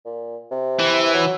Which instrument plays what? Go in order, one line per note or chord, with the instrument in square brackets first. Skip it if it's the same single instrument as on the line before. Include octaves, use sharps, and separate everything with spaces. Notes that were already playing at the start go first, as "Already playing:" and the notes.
[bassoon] A#2
C3
[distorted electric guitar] E3
[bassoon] F#3